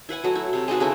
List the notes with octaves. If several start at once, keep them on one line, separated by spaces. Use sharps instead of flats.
E4 B4 F#5 G#5
F#3 A3 F#4
E4
C3 A3
G#3 D#4 F#4 B4
C#3 G#3 A3 E4